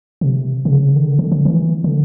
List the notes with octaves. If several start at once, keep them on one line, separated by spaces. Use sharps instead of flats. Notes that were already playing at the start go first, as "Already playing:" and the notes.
C#3
C3
C#3
D#3
D3
D3
D3
E3
D3